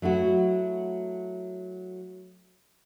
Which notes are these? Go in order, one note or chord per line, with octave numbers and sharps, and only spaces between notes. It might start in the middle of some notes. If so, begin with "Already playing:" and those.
F#3 A3 E4 F#4